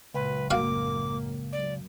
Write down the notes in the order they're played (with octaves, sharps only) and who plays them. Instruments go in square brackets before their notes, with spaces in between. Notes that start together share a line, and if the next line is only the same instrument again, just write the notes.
[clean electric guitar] C#2 [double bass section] A#2 F#3 [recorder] B4
[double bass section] A1 F#2 A#3 [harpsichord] F#4 F5 [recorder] D6
[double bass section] F#2 [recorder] D5